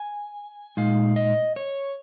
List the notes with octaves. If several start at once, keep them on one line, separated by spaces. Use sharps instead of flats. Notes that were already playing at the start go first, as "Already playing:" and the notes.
Already playing: G#5
A#2 G#3 D#4 F5
D#5
C#5